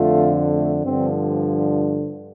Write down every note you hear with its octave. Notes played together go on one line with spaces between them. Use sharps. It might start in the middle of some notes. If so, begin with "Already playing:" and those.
Already playing: F2 D3 A3 F4
A3
G2 D3 F3 C4